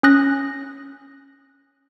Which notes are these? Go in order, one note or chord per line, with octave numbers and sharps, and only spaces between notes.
C#4 D#6 F#6 A#6